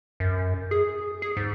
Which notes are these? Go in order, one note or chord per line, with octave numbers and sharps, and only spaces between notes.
F#2
G#4
G#4
G#2